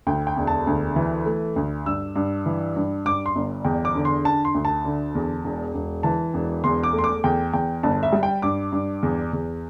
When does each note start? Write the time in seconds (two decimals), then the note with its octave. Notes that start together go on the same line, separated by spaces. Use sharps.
0.07 D2 G5
0.27 G5
0.37 E1
0.47 A5
0.67 D2
0.96 E3
1.26 A3
1.56 D2
1.86 G2 E6
2.15 G2
2.46 E3
2.76 G2
3.05 G2 D6
3.26 C6
3.35 G1
3.65 E2 G5
3.85 D6
3.95 D3
4.05 C6
4.24 D4 A5
4.45 C6
4.55 D2
4.65 A5
4.85 D3
5.15 E2
5.44 E1
5.75 E1
6.03 E3 A5
6.34 E1
6.64 E2 C6
6.83 D6
6.93 A3
6.98 C6
7.04 D6
7.24 E2 G5
7.53 E2 G5
7.83 G1 A5
8.03 E5
8.12 G3
8.23 G5
8.42 G2 D6
8.72 G2
9.03 E2
9.33 E2